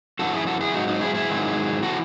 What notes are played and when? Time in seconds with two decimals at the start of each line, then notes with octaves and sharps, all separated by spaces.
0.19 F#2 E3 F#4 A4
0.33 E4 G#4
0.47 F#4 A4
0.60 E4 G#4
0.74 G#2 F#3 D#4 F#4
0.88 D#4 F#4
1.01 E4 G#4
1.15 E4 G#4
1.29 G#2 D#3 F#3
1.83 E3 F#4 A4